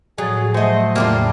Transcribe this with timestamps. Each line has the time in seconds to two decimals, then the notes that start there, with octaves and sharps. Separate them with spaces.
0.18 A2 F3 F#3 G#4 A6
0.54 F#3 A3 F#4 C5 D#5
0.96 E2 A2 C#3 G3 A#3 D4 F4